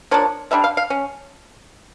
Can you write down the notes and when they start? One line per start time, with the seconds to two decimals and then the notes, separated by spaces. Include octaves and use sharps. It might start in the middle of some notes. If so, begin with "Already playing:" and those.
0.11 F3 A#3 D4 C#5
0.51 D3 G3 D4 E5
0.64 F5
0.77 F5
0.90 C#4